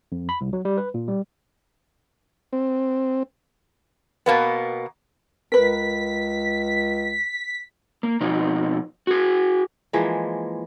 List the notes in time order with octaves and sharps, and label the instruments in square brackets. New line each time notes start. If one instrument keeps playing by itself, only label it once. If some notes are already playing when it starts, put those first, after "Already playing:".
[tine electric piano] F2
B5
C2
F#3
G3
B4
A#2
G3
[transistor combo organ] C4
[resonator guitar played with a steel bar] B2 A#3 B3
[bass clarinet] C#2 [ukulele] A#4 B4 [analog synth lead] B6
[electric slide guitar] A#3
B2 F3 D#4
F#4 G#4
[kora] E3 F3 G#3 A#3